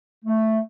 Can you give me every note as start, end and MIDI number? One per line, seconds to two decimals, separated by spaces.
0.25 0.58 57